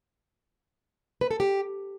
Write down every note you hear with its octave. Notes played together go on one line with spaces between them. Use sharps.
B4
A4
G4